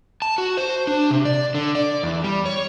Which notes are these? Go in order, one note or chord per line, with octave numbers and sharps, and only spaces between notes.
A5
F#4
C5
D4
C3
D5
D3
D5
E2
G3
C#5